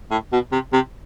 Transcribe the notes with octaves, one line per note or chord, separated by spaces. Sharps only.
A2
B2
C3
C3